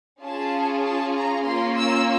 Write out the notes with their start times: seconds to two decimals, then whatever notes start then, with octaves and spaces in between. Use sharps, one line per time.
0.22 C#4 F4 G#4 A5
0.83 A5
1.14 A#5
1.45 A#3 C#4 F4 C6
1.75 E6